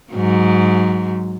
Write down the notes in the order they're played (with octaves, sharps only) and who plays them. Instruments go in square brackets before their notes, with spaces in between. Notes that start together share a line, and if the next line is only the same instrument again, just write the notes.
[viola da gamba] G#2 F#3